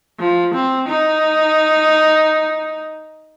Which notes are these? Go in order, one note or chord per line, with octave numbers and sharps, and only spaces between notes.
F3
C4
D#4